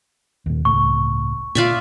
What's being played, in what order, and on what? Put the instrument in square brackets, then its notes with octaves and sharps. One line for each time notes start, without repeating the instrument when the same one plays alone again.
[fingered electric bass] D#2 A#2
[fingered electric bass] G1 C#2 A2 [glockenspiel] C#6
[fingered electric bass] A#2 [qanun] F4 D5 E5